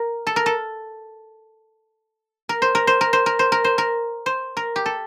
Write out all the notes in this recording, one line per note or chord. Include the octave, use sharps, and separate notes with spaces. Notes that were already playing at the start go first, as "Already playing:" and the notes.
Already playing: A#4
A4
A#4
A4
A#4
C5
A#4
C5
A#4
C5
A#4
C5
A#4
C5
A#4
C5
A#4
G4
A4